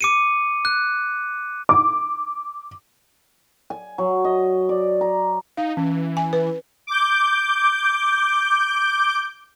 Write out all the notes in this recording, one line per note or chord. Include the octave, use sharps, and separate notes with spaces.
D6 C#7 D#7
F#6
D6
G#5
F#3
D#5
D5
A#5
D#4 F5
E3 C#4
G#5
B4
D6 G6